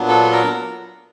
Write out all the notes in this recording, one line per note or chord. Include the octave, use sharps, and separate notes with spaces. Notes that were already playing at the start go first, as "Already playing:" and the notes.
Already playing: A#2 F#3 B3 D4
A4
A4
A#4